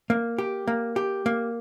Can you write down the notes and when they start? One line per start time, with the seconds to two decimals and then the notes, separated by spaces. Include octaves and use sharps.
0.10 A#3
0.38 G4
0.67 A#3
0.96 G4
1.26 A#3